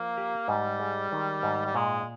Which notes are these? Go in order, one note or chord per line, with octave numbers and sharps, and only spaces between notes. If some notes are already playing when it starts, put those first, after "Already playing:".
Already playing: F3 A#3
G4
G#2 G3
G#3
D#3
G#2
G3
A#2 G#3